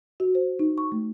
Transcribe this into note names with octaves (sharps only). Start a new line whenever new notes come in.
F#4
C5
D#4
C#6
A3